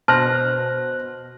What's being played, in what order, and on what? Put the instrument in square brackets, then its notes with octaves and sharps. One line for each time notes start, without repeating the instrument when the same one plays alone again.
[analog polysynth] B2 [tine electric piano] C5 F#6 A#6 [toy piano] A5 [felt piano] F6